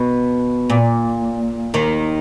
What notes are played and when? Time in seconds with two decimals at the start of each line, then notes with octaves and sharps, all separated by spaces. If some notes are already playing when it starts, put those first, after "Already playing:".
Already playing: B2
0.70 A#2
1.74 D#2 D#3